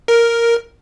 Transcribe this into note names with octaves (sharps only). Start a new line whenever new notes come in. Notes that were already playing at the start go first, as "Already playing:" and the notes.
A#4